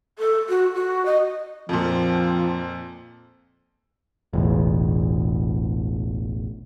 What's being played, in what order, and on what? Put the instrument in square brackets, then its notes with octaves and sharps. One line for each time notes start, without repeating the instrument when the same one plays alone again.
[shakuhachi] A4
F#4
F#4
D#5
[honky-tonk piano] F2 A#2 [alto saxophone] F3 [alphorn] C4
[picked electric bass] E1 A1